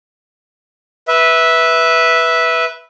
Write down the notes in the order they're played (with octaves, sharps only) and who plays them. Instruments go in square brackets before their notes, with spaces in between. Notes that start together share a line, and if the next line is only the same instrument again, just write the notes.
[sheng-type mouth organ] B4 E5